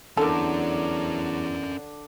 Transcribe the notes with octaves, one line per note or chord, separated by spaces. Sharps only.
E2 D3 A#3 C#4 D4 A4 A#4